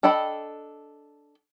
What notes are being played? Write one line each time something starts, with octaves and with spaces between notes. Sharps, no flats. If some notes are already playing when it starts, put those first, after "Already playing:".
D4 A4 D#5 G5 B5